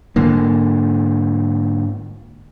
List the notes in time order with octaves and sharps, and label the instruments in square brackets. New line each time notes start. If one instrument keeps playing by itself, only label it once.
[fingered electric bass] G#2 D3 A#3